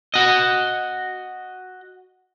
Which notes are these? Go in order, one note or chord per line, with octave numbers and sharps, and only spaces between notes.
F#4 D#5